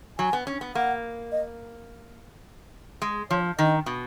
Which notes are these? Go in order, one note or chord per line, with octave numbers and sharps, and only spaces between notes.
F#3 G#5
B3
C#4
B3
A#3 F#5
D#5
G#3
F3 C#5
D#3 D#5
B2